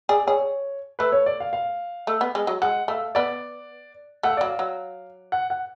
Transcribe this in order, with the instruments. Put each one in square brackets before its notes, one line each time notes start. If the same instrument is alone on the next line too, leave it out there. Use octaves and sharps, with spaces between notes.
[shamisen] G#4 [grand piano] D5
[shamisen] G#4 [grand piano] C#5
[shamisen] A3 [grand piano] B4
[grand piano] C#5
D5
F5
F5
[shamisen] A3
B3
G#3
F#3
[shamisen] G#3 [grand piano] F#5
[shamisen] A3 [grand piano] F5
[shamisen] B3 [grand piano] D5
[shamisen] A3 [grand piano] F#5
[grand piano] F5
D5
[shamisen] F#3 [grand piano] F5
[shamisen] F#3
[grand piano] F#5
F#5